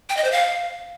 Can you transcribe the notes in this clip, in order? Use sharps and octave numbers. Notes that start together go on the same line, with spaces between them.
G5
D#5
C5
F5